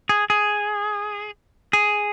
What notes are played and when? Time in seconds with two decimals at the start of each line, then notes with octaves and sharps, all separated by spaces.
0.09 G#4
0.30 G#4
1.73 G#4